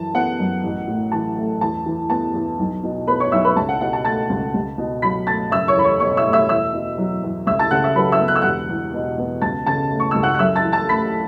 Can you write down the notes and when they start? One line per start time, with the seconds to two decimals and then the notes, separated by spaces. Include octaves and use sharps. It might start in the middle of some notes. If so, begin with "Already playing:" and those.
Already playing: F#2 E3 A5
0.14 B3 F#5
0.40 F#2
0.63 A1
0.87 A2
1.12 E3 A5
1.37 A3
1.61 E2 A5
1.86 E3
2.10 B3 A5
2.34 E2
2.59 B1
2.83 B2
3.07 B3 B4 B5
3.20 C#5 C#6
3.32 B1 E5 E6
3.45 B4 B5
3.56 C#2 A5
3.69 F#5
3.81 B2 F#5
3.93 A5
4.05 A3 A5 A6
4.30 C#2
4.54 C#2
4.78 B2
5.02 F#3 B5 B6
5.27 A3 A5 A6
5.51 F#1 E5 E6
5.68 C#5 C#6
5.76 E2 B5
5.84 C#5 C#6
6.00 B2 C#5 C#6
6.17 E5 E6
6.25 A3
6.33 E5 E6
6.49 E2 E5 E6
6.73 B2
6.98 F#3
7.23 E2
7.47 C#2 E5 E6
7.59 A5 A6
7.71 C#3 F#5 F#6
7.84 E5 E6
7.96 F#3 B4 B5
8.12 E5 E6
8.20 B3
8.28 F#6
8.36 E6
8.42 E1 F#5 F#6
8.69 E2
8.94 B2
9.18 B3
9.42 C#2 A5 A6
9.66 C#3 A5 A6
9.90 A3
10.00 C#6
10.11 C#2 E6
10.23 F#5 F#6
10.34 F#6
10.39 F#2 E5 E6
10.55 A5 A6
10.65 E3
10.73 A5 A6
10.89 A3 B5 B6